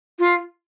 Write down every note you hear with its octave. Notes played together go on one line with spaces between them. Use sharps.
F4